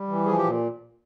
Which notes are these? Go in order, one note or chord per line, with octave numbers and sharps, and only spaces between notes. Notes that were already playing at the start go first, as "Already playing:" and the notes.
Already playing: G3
E3
F3 G#4
G4
A#2